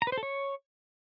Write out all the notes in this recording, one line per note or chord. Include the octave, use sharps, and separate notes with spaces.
A#5
B4
C5
A4
C#5